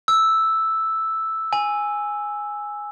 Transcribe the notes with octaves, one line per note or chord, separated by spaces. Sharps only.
E6
G#5